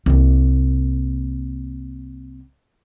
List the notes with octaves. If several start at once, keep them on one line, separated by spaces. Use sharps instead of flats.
C2 A#3